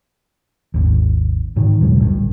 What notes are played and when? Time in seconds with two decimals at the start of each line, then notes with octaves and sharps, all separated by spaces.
0.74 G#1 D#2
1.56 G#2 D3 D#3
1.81 E2 B2 F#3 G#3
2.00 A1 D2 G2